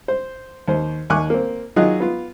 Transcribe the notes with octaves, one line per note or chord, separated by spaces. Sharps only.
C5
D#2 C5
D#2 G#5 C#6 D6 F#6
A#3 C4
D#3 F#3 F4 G#4 D#5 F#6
B3 F4